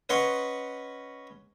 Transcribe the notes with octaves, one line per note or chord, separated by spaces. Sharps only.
C#4 B4 D#5 F#5 C6